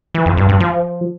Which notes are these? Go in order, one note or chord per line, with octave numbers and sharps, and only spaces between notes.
E3
F2
G2
G2
F3